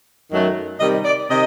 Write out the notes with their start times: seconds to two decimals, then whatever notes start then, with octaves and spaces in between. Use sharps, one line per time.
0.31 F#2 D#3 F#3 A3
0.80 C3 D#3 G3 D#5
1.05 D5
1.29 C3 D#3 D#5